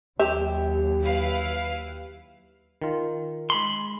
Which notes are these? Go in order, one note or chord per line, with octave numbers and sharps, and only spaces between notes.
D#2 F#3 G4 E5
E4 B4 F5
D#3 F4
G#3 B5 C6